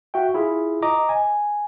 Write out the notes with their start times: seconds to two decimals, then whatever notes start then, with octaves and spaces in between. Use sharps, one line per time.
0.14 F#4 E5 G5
0.34 E4 F4 G#4
0.82 D#5 A#5 D6
1.09 G#5